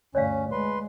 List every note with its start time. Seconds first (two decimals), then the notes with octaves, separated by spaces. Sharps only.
0.15 D2 G2 C#4 C#5 D5 F5
0.52 G#3 B4 C6